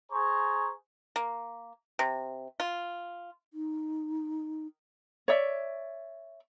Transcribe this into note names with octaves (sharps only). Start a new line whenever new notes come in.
G#4 C5 A#5 C#6
A#3
C3
F4
D#4
C#5 D5 E5